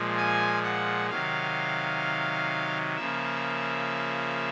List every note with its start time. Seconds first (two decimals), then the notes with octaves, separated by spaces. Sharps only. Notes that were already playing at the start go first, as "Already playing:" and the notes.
Already playing: A#2 F3 G#3
0.17 G#5
0.64 F#5
1.10 C3 D#3 F#3 F5
2.96 C#3 F3 A#3 E5